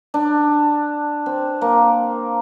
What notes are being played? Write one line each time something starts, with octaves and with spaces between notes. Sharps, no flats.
D4
C4
A#3